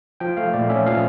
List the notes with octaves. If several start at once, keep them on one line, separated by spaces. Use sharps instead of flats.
F3 G5
A3 F5
A#2 D5
C#4 E5
F3 F5